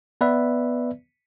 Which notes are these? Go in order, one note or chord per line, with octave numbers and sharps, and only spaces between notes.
B3 B4 D5 E5